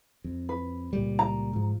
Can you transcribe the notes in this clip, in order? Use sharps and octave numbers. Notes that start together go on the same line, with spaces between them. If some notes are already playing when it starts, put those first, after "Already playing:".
F2
B4
C#2 A#2 G3
A#5
G#2 F3